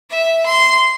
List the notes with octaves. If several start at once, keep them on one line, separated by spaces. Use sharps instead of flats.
E5
C6